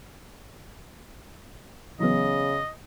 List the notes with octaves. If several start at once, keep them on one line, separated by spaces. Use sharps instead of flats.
C#3 E3 F#3 B3 D#5